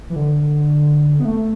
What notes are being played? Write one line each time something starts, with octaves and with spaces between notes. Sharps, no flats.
E3
D3
B3
A3